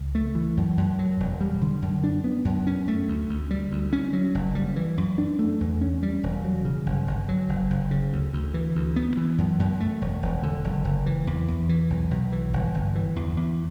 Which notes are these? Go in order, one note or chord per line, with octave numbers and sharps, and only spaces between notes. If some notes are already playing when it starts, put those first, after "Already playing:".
Already playing: C#2
A3
E3
F#2
F#2
F#3
E1
G3
D3
F#2
D4
B3
F#2
C#4
A3
D2
D2
G3
D2
C#4
F#3
F#1
G3
E3
F#2
D4
A3
E2
C#4
G3
E1
F#3
C#3
G1
G1
F#3
F#1
F#1
C#3
D2
D2
E3
D2
B3
E3
F#2
F#2
A3
E1
E1
D3
F#1
F#1
E3
E2
E2
E3
B1
B1
E3
G1
G1
E3
E2
E2